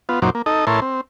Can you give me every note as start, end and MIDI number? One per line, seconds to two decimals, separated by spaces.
0.09 0.20 59
0.09 0.20 65
0.22 0.30 42
0.22 0.30 46
0.22 0.30 54
0.22 0.30 63
0.22 0.30 72
0.22 0.30 86
0.35 0.42 58
0.46 0.65 63
0.46 0.65 69
0.46 0.65 75
0.67 0.80 45
0.67 0.80 64
0.67 0.80 70
0.67 0.80 73
0.67 0.80 81
0.67 0.80 84
0.82 1.01 60